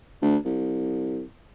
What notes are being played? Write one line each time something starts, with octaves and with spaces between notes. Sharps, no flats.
D2
C2